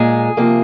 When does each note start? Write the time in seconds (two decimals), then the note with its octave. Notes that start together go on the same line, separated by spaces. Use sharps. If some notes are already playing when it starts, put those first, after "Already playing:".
Already playing: A#2 G#3 G#4
0.37 C3 F3 A#3